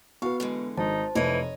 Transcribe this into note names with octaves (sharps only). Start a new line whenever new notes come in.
B3 F#4 B4 F5 C#6
D3 E3 G#3
G#1 D#4 C5 A5
F1 E3 C#5 D#5